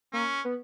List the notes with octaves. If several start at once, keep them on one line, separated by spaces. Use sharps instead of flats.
A#3 C#4
B3